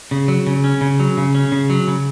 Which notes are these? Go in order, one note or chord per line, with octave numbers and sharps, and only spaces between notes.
C#3
F#3
C#3
C#4
C#3
F#3
C#3
C#4
C#3
F#3
C#3